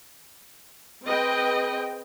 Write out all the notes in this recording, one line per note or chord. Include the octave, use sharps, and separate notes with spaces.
C4 G#4 B4 D#5 G5